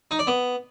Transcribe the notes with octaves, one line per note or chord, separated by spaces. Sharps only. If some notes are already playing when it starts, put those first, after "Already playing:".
D#4
D5
B3